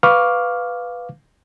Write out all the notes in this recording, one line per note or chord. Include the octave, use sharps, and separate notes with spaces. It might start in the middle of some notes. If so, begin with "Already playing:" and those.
B4 F5 C#6 D6 F6